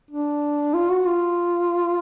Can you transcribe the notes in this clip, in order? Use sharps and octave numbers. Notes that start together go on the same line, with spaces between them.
D4
F4
F#4
F4